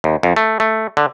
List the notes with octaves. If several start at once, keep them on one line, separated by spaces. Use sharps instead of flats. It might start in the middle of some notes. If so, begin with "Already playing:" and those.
D#2
F2
A3
A3
D3